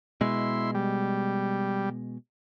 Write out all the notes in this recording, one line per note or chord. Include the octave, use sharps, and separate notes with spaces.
B2 G#3 E4 C6
G3